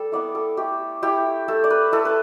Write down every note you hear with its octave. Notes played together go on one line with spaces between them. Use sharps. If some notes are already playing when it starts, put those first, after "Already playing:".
Already playing: G3 A4
B3 E4 D5
A4
A3 G4
E4 G4
A3 A4
D5
B4
E4 A4
B4